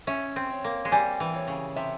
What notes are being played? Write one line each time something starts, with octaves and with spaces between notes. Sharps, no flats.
C#4 E5
C4
C#5
A#3
G#3
G3 G#5
E3
C#5
C#3
C3 E5